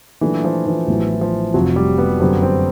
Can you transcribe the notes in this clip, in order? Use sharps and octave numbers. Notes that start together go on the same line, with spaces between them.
A#2 E3 F#3 A3 D4
F3
E3
A1 A2 F#3 B3
F3
F1 F2 C3 F3 F#3
G3
B3
F#2 D3 F#3 C4
C4